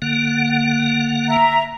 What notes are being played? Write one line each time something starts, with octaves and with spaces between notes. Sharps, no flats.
D3 A#3 F#5
E5 A#5